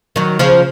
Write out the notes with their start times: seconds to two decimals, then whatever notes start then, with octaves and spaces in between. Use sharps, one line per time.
0.16 D#3 F#3
0.39 C#3 F3